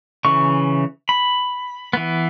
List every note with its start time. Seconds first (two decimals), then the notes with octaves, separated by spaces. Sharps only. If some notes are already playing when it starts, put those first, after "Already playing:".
0.25 C#3 E3 C#6
1.09 B5
1.93 E3 B3